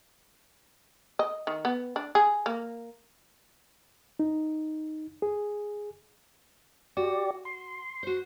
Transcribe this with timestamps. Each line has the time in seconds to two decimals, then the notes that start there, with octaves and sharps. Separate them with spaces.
1.19 D#5
1.47 D#3
1.65 B3
1.96 D4
2.15 G#4
2.46 A#3
4.19 D#4
5.22 G#4
6.97 F#4 G4 D5
7.45 C6
8.03 F#4 C5